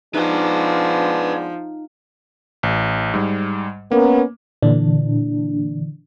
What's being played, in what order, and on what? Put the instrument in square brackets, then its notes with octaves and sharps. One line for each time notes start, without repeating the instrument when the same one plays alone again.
[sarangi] F3 [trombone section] G#3 B3 D4 [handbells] D#4 [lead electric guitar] B4 F5
[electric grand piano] A1
G#2 G3
[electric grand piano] A#3 [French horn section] B3 C#4 A#4
[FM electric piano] A#2 D3 E3 D4